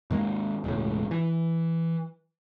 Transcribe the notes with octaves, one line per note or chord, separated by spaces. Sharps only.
G#2 D#3 G#3 A#3
E1 C#2 A2
E3